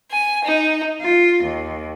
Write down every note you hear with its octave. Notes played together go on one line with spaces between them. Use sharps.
G#5
D#4
F4
D#2